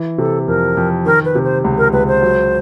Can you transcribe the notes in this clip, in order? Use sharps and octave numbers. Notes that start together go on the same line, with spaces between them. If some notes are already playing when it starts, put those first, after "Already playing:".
Already playing: E3
C3 A4
F2 A#4
F2
D#3 A#4
B4
C3
C5
C#2
A#4
C#2 B4
C5
F#3